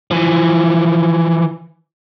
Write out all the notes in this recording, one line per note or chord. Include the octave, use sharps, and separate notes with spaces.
E3 F3